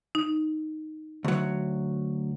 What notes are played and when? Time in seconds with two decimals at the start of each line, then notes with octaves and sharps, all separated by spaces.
0.15 D#4
1.24 D2 F#3